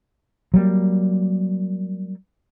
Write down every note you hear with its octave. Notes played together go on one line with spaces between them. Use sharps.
F#3 G3 A#3